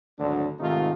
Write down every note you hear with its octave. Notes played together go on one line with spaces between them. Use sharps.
G#1 D2 D3 F#3 D4
G#2 C3 D#3 A3 D#4 F4